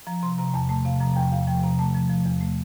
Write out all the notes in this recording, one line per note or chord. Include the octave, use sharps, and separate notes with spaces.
F3 A#5
C3 C6
C3 A#5
E2 A5
A3 A5
C3 F5
F3 A#5
E2 G5
E2 F5
F3 G5
C3 A#5
A3 A5
F3
F3
E2
A3